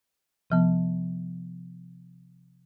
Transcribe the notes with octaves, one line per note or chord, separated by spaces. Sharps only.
C3 F3 B3